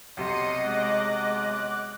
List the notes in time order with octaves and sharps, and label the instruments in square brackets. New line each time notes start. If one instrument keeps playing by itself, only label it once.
[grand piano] B1 C3 C6 [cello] D#5 [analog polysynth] C7 C#7 D#7
[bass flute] G#3 [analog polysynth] D6 F#6